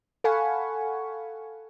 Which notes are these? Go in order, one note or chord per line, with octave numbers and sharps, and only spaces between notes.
A4 F5 F#5 G#5 B5 C#6